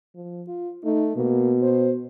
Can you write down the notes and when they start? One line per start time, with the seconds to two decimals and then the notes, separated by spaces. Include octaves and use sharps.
0.15 F3
0.48 F4
0.84 A3 D#4
1.17 B2 A#3
1.62 C5